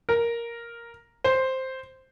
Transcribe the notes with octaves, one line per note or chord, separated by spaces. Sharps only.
A#4
C5